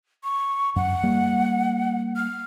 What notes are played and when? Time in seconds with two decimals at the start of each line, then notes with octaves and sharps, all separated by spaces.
0.24 C#6
0.76 F#2 F#5
1.03 G3 A#3
2.16 F6